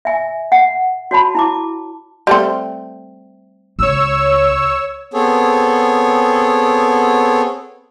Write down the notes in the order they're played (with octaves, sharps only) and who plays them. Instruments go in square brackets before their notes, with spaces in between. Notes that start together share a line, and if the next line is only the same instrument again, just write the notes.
[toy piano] E5 G#5
F#5
F#4 C#5 A5 B5
E4 A5 D6
[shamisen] G3 A3 C4
[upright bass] C#2 [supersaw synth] C#5 E6
[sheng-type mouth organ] B3 C4 G#4 A4 C#5